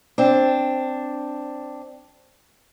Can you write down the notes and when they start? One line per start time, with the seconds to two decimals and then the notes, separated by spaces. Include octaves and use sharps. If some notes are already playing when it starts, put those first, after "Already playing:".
0.18 C4 D4